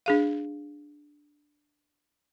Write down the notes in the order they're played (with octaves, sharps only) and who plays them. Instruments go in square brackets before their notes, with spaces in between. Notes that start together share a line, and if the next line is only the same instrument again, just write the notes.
[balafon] D4 G#4 F5